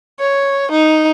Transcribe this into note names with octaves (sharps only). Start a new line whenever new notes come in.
C#5
D#4